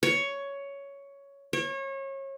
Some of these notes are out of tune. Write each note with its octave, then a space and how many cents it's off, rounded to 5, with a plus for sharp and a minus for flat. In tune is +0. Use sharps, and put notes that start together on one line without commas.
C#5 +10
C#5 -30